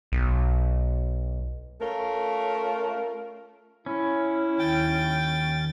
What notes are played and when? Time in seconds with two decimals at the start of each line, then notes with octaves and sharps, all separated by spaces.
0.12 B1
1.81 A3 C#4 F4 A#4
3.86 C#4 E4
4.59 D#2 G5 A6